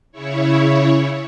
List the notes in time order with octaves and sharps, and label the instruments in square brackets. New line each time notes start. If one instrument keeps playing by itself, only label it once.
[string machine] C#3 E4 C#5